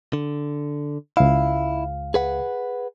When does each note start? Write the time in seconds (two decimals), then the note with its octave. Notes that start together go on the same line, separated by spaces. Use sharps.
0.13 D3
1.17 C#2 E4 F5
2.14 G#4 B4 F#5